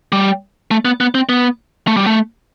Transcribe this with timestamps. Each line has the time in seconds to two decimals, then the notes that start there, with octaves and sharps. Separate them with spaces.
0.12 G3
0.71 A3
0.85 B3
1.00 B3
1.15 C4
1.29 B3
1.87 A3
1.97 G3
2.06 A3